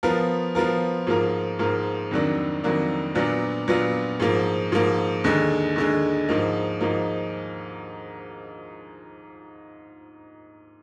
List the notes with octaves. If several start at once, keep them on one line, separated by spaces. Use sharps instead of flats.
F3 B3 F4 A#4
F3 B3 F4 A#4
G#2 F3 A#3 F4 A#4
G#2 F3 A#3 F4 A#4
F2 D#3 F#3 A#3 D4
F2 D#3 F#3 A#3 D4
A#2 F#3 B3 D4 F4
A#2 F#3 B3 D4 F4
G#2 F3 A#3
G#2 F3 A#3
D#2 D3 G#3
D#2 D3 G#3
G#2 F3 A#3 D#4
G#2 F3 A#3 D#4